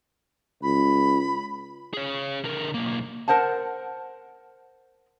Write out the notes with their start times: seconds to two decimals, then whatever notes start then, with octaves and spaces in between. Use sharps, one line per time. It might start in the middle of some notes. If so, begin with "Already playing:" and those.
0.63 C#2 B5
1.94 G#4 C#5
2.44 D3 A#4
2.74 B1 A#3
3.28 A#4 C5 F#5 A5